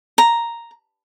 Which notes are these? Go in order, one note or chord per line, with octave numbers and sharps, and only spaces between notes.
A#5